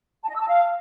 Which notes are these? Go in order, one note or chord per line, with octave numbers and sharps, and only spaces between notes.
A5
D#5
E6
A5
F5